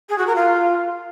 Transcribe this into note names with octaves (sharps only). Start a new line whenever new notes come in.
G#4
F#4
A#4
F4